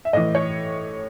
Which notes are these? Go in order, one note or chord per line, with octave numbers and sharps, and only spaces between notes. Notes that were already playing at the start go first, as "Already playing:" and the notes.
E5
A2 E3 D#5
C#5